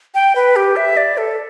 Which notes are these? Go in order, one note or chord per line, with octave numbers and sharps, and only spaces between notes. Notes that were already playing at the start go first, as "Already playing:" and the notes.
G5
B4
G4
E5
D5
A4